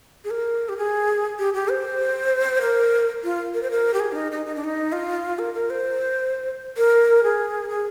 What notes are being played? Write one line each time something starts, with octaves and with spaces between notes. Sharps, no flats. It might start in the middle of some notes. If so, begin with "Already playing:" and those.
G#4
A#4
G4
G#4
G4
G4
C5
A#4
F4
A#4
C5
A#4
G4
G#4
D4
D#4
D#4
D#4
D4
D#4
F4
A#4
A#4
C5
A#4
G#4
G#4